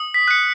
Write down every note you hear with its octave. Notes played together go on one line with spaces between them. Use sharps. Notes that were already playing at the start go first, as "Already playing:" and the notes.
Already playing: D#6
B6
F#6 C#7